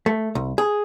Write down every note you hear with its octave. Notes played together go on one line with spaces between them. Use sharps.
A3
C2
G#4